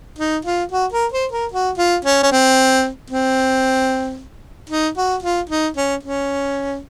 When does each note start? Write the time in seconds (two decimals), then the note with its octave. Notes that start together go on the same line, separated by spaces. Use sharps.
0.18 D#4
0.45 F4
0.71 F#4
0.92 A#4
1.12 C5
1.32 A#4
1.52 F#4
1.78 F4
2.05 C#4
2.22 C#4
2.31 C4
3.10 C4
4.69 D#4
4.97 F#4
5.22 F4
5.49 D#4
5.77 C#4
6.03 C#4